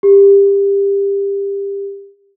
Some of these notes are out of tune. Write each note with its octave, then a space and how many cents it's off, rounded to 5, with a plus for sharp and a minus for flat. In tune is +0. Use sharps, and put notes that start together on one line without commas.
G4 +25